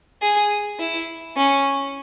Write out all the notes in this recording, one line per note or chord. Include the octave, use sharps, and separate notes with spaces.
G#4
E4
C#4